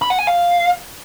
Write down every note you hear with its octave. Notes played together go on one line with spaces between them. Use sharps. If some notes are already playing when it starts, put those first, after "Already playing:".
B5
F#5
G#5
F5